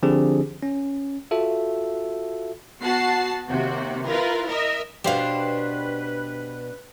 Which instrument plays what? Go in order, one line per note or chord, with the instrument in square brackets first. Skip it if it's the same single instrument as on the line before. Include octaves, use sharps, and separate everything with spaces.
[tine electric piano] D3 F3 C4 D4 G4 G#4
C#4
F4 F#4 A4 E5
[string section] B3 F#4 F#5 A5 C7
D#2 C3 F#4
E4 F4 A#4 B4
A#4 D#5 E5
[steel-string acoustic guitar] B2 D4 [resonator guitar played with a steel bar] G4 C5 F5 [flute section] B4